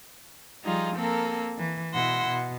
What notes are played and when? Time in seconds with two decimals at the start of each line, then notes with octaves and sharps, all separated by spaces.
0.63 F3 G3 D#4 F4 G#4
0.95 A#3 C4 A4 A#4
1.58 E3
1.93 B2 E4 F#5 C6 E6 A#6
2.26 B2